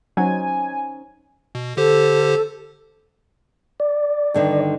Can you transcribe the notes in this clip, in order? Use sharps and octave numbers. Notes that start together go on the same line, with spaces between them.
F#3 C#4 D#4 C5 G#5
B2
D3 G4 A4 C5
D5
G2 D3 D#3